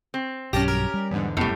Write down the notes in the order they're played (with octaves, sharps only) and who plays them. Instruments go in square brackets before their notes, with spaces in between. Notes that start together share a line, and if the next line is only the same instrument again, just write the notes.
[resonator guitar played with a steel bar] C4
[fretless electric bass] B1 G2 F#3 [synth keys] G3 A5 A#6 [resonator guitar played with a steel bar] C#4 G4
[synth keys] A#4
[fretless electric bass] G3
[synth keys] E2 G#2 D3
[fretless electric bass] F1 B3 [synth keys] F#2 [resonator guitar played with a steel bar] A2 G3